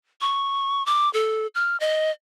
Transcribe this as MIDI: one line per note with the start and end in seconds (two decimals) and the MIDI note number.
0.21 0.85 85
0.86 1.11 86
1.13 1.47 69
1.55 1.77 89
1.80 2.11 75